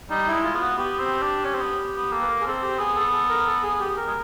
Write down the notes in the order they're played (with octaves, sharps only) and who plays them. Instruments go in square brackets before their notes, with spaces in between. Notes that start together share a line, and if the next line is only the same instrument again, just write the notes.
[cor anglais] G3 [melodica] D#4
[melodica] E4
[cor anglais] G#3
[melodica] F4
[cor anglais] B3
[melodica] F#4
[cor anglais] B3 [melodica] G4
[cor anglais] C4
D4
C#4
C4
B3
B3
[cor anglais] A#3 [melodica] A4
[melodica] B4
A#4
G#4
[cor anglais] C4 [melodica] A4
[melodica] G4
[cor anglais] B3 [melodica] G#4
[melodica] A4
A4
A#4
A4
G#4
G4
A#4
[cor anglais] G#3